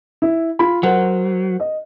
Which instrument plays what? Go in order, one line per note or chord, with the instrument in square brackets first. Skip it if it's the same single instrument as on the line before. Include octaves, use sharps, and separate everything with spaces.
[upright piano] E4
F4 B5
[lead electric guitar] F#3 [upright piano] A#4 C5 F#5
[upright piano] D#5